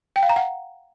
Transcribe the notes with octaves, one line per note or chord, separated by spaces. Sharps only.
G5
F5
A#5
F#5